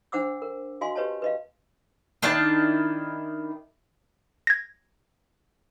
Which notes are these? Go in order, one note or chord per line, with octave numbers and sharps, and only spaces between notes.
D4 C5 F#5 D6 E6
A#4
F#4 D#5 F5 G#5 C6
G4 B4 C#5 D#5 A5
B4 D#5 F5
D#3 D4 E4 A5
G#6 A#6